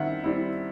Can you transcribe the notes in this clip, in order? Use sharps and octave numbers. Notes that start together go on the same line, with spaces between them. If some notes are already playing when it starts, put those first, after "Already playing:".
Already playing: D#3 G3 C4 E4 E5 F#5
G3 C4 E4